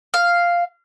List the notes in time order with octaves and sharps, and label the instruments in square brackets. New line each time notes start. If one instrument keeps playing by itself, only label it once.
[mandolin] F5